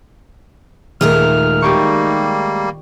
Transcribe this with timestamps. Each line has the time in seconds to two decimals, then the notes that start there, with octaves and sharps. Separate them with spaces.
1.01 D#1 G#3 A3 A#4 F6
1.62 G3 A#3 D#4 G4 D5 C#6